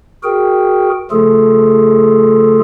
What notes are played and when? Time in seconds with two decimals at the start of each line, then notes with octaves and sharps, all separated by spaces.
0.24 F#4 G#4 A#4 G5
1.11 C#3 F3 A3 F4 G#4 A4